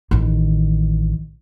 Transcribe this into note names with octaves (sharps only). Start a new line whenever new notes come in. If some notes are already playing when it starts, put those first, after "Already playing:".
A1 D#3